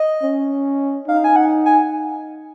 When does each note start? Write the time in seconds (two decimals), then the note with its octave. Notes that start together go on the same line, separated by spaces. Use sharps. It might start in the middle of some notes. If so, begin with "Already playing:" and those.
Already playing: D#5
0.22 C#4
1.07 D#4 F5
1.24 G#5
1.36 F#5
1.66 G#5